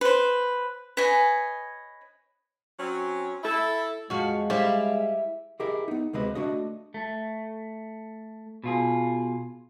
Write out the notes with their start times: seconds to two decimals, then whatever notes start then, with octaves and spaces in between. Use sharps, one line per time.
0.01 B4 C5
0.97 B4 C#5 D#5 G#5
2.79 F#3 C4 C#4
3.43 E4 A4
4.10 F2 F3 G#3 F#4 F5
4.50 G3 E4 C5 F5
5.60 E4 G4 G#4 A#4 D#5 E5
5.88 B3 D#4
6.13 D2 C3 G#3 C4 B4 D#5
6.35 A3 D4 F#4 D#5
6.94 A3
8.64 B2 F4 G#4